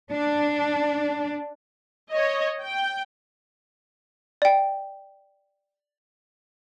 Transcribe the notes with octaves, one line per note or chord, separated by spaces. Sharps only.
D4
C#5 D#5
G5
D5 G5